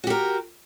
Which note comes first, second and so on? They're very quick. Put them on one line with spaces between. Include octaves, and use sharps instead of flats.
F#4 G4 A#4